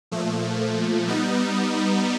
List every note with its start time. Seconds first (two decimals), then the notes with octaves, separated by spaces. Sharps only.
0.11 A#2 F3 A3
1.07 G3 B3 D#4